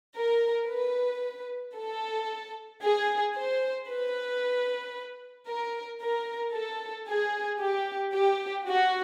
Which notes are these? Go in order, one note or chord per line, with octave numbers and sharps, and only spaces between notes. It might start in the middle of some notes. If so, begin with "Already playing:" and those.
A#4
B4
A4
G#4
C5
B4
A#4
A#4
A4
G#4
G4
G4
F#4